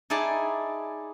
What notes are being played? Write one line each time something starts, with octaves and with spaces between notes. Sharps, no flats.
D#4 E4 G#4 D5 A5